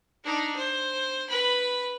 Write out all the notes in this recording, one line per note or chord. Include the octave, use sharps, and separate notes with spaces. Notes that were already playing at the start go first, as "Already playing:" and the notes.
D4 D#4
C5
B4 B5